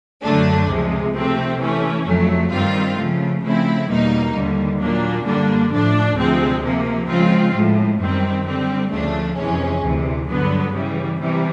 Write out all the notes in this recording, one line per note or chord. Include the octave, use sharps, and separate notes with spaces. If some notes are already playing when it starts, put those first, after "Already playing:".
F#2 D3 F#3 A3 D4
C#2 C3 F3 G#3
C3 F3 A3 C4
E3 A3 C#4
F2 C#3 F#3 A3
G2 D#3 G3 C4 F4
C#3 F3 A3
C#3 F3 A3 C4 E4
E2 B2 G3 A#3 D#4
D#2 D3 G3
A#2 F#3 A#3 D4
F#2 D3 G3 A#3 D4
A2 F3 A3 D4
D2 C3 F3 G#3 C4
C3 F3 A#3
C#3 F3 G#3 C4 F4
A2 F3 G#3
F#2 D#3 G3 C4
D3 G3 C4
D2 C#3 F3 A3 D4
F2 C3 E3 G#3 C#4
D2 C3 E3
G2 D3 F#3 B3
C#3 E3 G3
C3 E3 G3